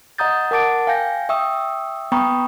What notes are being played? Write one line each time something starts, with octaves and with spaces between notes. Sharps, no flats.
D#5 F#5 A#5 D#6 G6 A6
A#4 F#5 A5 D6 A6 D7
F5 G5 G#5 G6 A#6
E5 G5 C#6 D#6 E6
B3 G5 A#5 B5 C#6 D#6